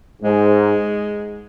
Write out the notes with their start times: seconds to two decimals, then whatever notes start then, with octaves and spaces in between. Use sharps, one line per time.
0.22 G#2 G#3